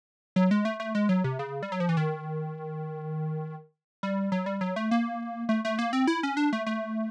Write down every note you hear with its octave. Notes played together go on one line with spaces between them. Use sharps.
F#3
G#3
A3
A3
G#3
F#3
C3
C#3
G3
F#3
F3
E3
D#3
G3
F#3
G3
F#3
A3
A#3
A3
A3
A#3
C4
E4
C#4
D4
A3
A3